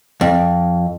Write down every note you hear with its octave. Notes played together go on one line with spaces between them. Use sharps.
F2